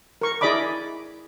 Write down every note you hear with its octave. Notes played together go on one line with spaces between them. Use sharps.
A#4 C#6
E4 G#4 D5 D#5 B5 D6